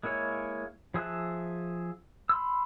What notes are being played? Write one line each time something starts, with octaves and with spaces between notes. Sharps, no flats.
G#3 A#3 E4 C#5 G#5
F3 G#4 E5 A5 F#6
B5 C6 E6